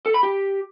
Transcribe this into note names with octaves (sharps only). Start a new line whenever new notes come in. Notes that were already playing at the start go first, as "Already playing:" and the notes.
A4
B5
G4